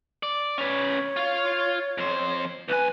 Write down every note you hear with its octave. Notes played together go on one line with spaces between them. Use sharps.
D5
C#4 B4 C#5
F4 F5
F2 C5
C2 B4 G#5